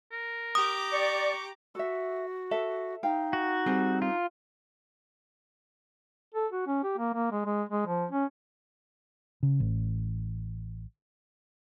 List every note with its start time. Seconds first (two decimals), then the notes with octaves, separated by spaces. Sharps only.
0.12 A#4
0.55 G4 A#5 D6 D#6
0.93 D5 C#6
1.75 F#4 A4 E5
2.51 A4 E5
3.03 D#4 F5 G5
3.33 F#4
3.66 G3 C4 G#4 A4
4.02 F4
6.35 A4
6.52 F#4
6.67 C#4
6.83 G4
6.98 A#3
7.14 A#3
7.32 G#3
7.46 G#3
7.70 G#3
7.87 F3
8.11 C#4
9.43 C#3
9.60 A1